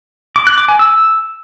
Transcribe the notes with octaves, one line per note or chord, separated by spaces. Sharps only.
D6
F#6
D6
G#5
E6